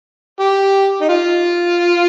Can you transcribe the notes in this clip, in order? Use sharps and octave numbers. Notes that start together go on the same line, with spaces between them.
G4
D#4
F4